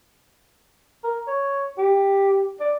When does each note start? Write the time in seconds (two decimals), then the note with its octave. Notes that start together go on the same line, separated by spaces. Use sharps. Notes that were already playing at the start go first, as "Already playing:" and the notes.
1.04 A#4
1.27 C#5
1.78 G4
2.60 D5